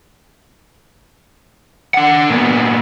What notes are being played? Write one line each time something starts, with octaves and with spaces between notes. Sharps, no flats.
D4 F#5
A#2 B3